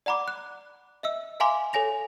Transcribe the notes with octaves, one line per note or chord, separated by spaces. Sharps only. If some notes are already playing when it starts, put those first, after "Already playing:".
D5 F#5 A#5 B5 D6
F#6
D#5 E5 E6
E5 F5 G#5 A#5 C6 D6
A4 C#5 G#5 A#6 F7